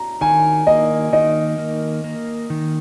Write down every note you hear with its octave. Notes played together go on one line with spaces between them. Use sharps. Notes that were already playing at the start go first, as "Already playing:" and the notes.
Already playing: A#5
D#3 G#5
A#3 D#5
D#3 D#5
A#3
A#3
D#3